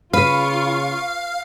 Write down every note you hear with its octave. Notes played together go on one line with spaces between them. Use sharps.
C#3 F4 B4 F5 C#6